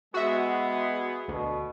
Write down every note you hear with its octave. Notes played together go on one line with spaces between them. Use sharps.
G#3 B3 F#4 G#4 E5
D2 B2